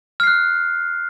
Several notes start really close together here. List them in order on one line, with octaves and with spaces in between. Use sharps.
F6 C7 F#6